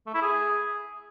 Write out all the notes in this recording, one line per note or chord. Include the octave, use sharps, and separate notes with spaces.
A3
E4
G#4